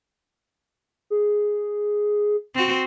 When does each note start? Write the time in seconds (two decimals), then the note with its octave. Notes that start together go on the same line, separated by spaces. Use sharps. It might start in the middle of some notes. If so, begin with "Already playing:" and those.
1.10 G#4
2.54 C4 F#4